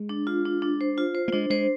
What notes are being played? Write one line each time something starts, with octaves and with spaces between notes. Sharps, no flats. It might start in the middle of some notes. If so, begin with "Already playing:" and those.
Already playing: G#3
D4
F4
D4
D4
C5
F4
C5
A#3
G#3 D4
G#3 C5